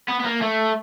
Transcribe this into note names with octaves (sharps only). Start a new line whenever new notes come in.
B3
B3
A#3
A3